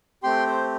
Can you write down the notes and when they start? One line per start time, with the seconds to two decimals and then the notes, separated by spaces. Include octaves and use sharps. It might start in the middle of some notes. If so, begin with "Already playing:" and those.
0.23 A3 C4 G4 G5 C6
0.47 C5